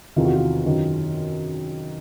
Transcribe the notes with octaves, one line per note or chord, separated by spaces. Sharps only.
E2 C3 D#3 F4
F#4
F4
F#2 D#3